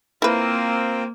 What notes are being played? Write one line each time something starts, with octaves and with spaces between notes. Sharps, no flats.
A#3 C4 E4 F4 A#4 B4